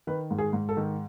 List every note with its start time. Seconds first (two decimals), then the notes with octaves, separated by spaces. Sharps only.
0.07 D#3 B4
0.31 G#2
0.38 G#4
0.53 G#2
0.69 A4
0.77 D#3